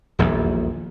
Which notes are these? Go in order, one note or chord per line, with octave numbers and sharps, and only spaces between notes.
D#1 A#1 E2